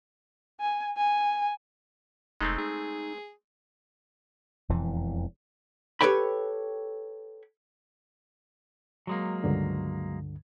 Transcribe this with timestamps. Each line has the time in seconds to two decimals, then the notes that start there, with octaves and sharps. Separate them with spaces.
0.60 G#5
0.97 G#5
2.41 F1 G#3 A3 C4 D#4
2.58 D#4 G#4
4.69 E1 F2 E3
6.01 G4 A4 B4 C#5 G5 B5
9.07 F#3 G#3 A#3
9.44 C#2 G2 D3